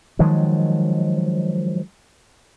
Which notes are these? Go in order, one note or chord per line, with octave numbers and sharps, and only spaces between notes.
D#3 F3 F#3 G#3